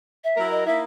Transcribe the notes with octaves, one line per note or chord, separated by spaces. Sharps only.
E5
F#3 E4 A#4
D#5
A#3 D#4 E4 E5